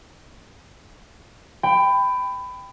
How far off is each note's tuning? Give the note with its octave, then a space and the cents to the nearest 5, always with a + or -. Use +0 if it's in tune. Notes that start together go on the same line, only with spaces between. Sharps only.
G5 +10 B5 +25